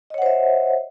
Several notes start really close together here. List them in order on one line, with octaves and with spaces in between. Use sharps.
D#5 C#5 F#5 C5 E5